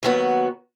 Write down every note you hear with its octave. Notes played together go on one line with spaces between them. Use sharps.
D#2 D#3 F#3 B3 F#4